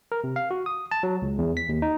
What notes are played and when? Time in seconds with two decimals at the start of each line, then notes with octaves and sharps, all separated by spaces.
0.12 A#4
0.24 C3
0.36 F5
0.51 F#4
0.66 D#6
0.91 A5
1.03 F#3
1.22 C#2
1.38 E2
1.57 B6
1.69 D#2
1.82 D#4